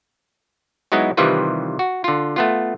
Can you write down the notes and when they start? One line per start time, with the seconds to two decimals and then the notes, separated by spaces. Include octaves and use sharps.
0.92 F#3 G#3 B3 D#4 E4
1.17 C3 D#3 E3 G3 F4 B4
1.79 F#4
2.04 D3 F4
2.36 A3 B3 F4